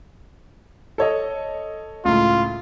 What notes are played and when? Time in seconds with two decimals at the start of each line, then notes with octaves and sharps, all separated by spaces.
0.98 A4 C#5 D#5
2.05 C#2 A2 F4